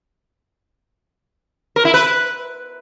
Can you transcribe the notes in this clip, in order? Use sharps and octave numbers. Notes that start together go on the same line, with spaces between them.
A#4
E4
B4